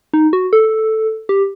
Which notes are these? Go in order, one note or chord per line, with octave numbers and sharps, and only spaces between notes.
D#4
F#4
A4
G4